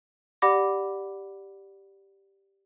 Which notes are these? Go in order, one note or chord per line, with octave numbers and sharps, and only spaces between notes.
G4 D5 F#5 B5 D6 A#6